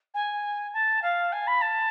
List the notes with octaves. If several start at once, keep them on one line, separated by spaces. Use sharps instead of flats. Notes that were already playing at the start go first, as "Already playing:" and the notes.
G#5
A5
F5
G#5
B5
A5